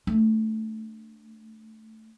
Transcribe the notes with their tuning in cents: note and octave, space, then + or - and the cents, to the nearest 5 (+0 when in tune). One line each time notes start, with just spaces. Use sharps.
A3 +0 D4 +0